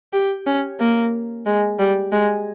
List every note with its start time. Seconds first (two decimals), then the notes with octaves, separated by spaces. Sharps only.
0.13 G4
0.46 C#4
0.80 A#3
1.46 G#3
1.79 G3
2.12 G#3